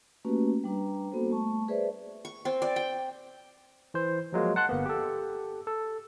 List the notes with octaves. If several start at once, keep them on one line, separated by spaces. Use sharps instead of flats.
A3 A#3 C#4 F#4 G4 B4
G3 D4 B4 A#5
A#3 B3 F#4 A4 C5
A3 A5 C#6
G#4 B4 C5 D5 E5
C#6
C4
D5
G5
E3 C5
F3 F#3 G#3 A#3
F#5 A5 C6 F#6
G1 A#3 B3
G4 A4
A4